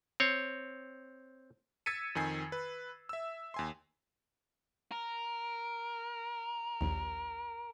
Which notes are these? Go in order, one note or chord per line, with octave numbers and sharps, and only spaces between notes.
C4 C#5
E6 G#6 A6 B6 C#7 D#7
F2 D#3 G#5 C7
B4
E5 E6
D#2 G#5 C6
A#4
A#1 D#2